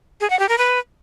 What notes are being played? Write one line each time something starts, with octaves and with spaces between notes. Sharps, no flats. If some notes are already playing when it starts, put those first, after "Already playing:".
G#4
F#5
G4
A#4
B4